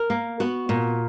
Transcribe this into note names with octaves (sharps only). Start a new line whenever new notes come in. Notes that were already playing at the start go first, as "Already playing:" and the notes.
Already playing: A#4
A#3
B3 F#4
A#2